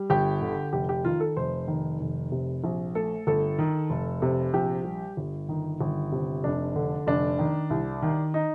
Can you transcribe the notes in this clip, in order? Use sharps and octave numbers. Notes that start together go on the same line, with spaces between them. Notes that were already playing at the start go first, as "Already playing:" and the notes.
Already playing: G3
G1 G4
D3
F1 G4
G4
D#3 F4
A4
F1 C5
D#3
F1
C3
A#1
A3 A4
G1 A4
D#3
F1
C3
A#1 G4
G3
G1
D#3
G1
C3
F1 D4
D3
F1 D4
D#3
C2
D#3
D#4